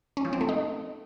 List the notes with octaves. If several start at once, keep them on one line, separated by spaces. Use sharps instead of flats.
C#4
F3
C4
A3
D#4